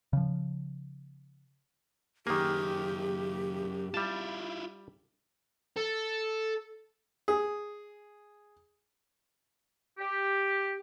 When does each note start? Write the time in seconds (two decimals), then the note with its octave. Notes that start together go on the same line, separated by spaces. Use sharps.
0.13 C#3 F3
2.27 F#2 D#3 A#3 G4 G#4
3.94 G3 E4 F4 A5
5.76 A4
7.28 G#4
9.98 G4